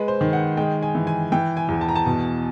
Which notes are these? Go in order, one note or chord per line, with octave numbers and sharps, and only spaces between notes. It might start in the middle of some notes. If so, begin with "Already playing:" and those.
Already playing: G#3 B4
C5
D#3
F#5
G#3 G5
G#5
E3
G#5
E3 G5
G#5
E2
A5
A#5
A5
B2